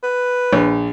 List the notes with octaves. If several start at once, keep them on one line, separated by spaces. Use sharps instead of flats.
B4
A#1